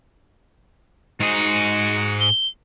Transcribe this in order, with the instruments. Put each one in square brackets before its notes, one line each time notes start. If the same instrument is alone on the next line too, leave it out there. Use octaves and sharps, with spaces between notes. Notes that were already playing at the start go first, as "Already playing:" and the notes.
[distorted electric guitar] G#2 G#4 [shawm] F#4
[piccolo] G7